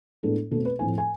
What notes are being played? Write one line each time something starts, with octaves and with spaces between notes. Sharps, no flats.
A2 G#3 B3 D4 A4
B2 A3 C4 A4
B4
A2 F3 A3 C4 G#5
G#5